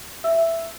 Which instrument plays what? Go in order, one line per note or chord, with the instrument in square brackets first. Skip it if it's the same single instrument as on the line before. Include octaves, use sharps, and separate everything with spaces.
[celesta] E5 E6